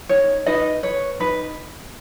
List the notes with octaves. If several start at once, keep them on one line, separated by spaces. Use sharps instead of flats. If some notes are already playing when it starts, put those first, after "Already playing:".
D#4 C#5
D#4 B4 D#5
B4 C#5
D#4 B4